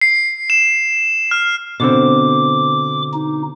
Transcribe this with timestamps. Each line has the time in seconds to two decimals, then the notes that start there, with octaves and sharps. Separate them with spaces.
0.01 C7
0.50 E7
1.31 F6
1.80 B2 D3 C4 D6
3.14 D#4